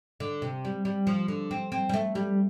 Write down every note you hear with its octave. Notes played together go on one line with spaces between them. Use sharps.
D3
C3
G3
G3
F3
D3
C4
C4
G3
A3
G3